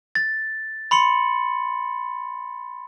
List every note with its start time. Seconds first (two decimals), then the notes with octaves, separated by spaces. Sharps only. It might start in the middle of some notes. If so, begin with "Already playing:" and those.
0.15 A6
0.91 B5 C6 C#7 F#7